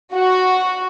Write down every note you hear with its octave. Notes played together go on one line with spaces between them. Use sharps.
F#4